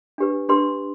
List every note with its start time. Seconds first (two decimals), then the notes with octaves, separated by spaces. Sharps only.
0.18 D4 G4 B4
0.49 D4 G4 B4 C6